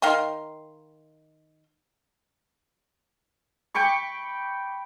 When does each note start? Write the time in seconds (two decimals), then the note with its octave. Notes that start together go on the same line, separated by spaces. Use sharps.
0.02 D#3 F5 G5 C6
3.75 G5 B5 C#6 D6